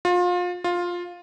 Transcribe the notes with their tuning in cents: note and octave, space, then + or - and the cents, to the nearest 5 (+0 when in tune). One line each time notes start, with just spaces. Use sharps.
F4 +30
F4 +10